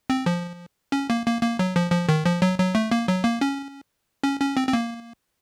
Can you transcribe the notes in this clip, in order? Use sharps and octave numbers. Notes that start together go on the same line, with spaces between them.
C4
F3
C#4
A#3
A#3
A#3
F#3
F3
F3
D#3
F3
F#3
F#3
A3
A#3
F#3
A#3
C#4
C#4
C#4
C4
C4
A#3